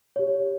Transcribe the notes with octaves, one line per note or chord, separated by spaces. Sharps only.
G4 C#5